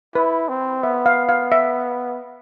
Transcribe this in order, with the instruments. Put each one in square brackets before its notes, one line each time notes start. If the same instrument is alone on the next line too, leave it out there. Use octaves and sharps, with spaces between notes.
[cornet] E4 [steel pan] B4
[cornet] C4
[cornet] B3 [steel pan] E5
[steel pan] F5
F5
E5